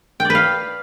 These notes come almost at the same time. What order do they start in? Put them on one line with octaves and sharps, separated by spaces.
G5 D5 B4 F5